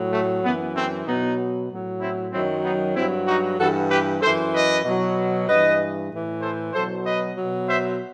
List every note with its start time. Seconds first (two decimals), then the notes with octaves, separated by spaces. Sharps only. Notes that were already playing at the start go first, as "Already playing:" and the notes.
Already playing: A2 F#3
0.13 A3
0.43 F#2 E3 B3
0.75 A3 C4
1.07 B2 F#3 B3 D#4
1.70 A2 F#3
2.01 C4 E4
2.33 F#2 D#3 F#3 C4 E4
2.64 B3 D#4
2.95 G2 F#3 C4 E4
3.27 D#4 F#4
3.58 G2 E3 F#4 A4
3.91 G4 B4
4.22 F#2 E3 A4 C5
4.54 B4 D#5
4.85 B2 F#3
5.48 G2 E3 B4 D#5
6.11 A2 E3
6.42 A4 C5
6.74 B2 F#3 A4 C5
7.05 B4 D#5
7.37 B2 F#3
7.68 C5 E5